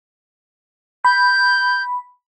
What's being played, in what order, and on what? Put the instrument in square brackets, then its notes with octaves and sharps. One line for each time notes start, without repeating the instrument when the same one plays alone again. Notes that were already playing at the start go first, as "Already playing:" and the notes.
[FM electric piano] B5 [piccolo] G6